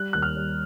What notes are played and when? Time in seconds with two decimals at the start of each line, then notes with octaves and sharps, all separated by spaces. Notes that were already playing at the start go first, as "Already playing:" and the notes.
Already playing: G3 F#6
0.13 D#2 F#6
0.22 F6
0.36 G3